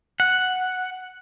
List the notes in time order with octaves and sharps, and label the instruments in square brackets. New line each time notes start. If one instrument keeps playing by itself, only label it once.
[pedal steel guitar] F#5